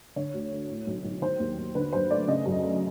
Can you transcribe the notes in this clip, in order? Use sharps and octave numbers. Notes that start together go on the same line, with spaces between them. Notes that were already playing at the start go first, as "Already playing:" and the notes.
D3 C#5
D2
A3
A2
B1
B1
D#3 C5
D#2
D#2
D3 B4
F#2 C5
A3 D5
C#3 D#5
F#2
A3